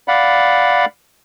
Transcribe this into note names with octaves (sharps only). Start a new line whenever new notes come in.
D5 F5 F#5 B5